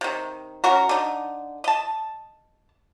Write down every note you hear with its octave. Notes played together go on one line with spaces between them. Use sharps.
C3 D#3
C#4 F#4 A#4
D3 D#4
D#5 A5